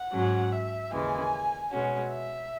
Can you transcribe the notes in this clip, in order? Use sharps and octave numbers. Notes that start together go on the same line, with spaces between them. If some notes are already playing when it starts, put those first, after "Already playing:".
Already playing: F#5
G#2 F#3 C#4
E5
D#2 C#3 E3 G#3 G#5
B2 G#3 C#4 F#4
E5